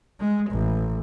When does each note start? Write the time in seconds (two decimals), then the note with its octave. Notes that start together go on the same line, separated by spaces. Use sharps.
0.20 G#3
0.51 A1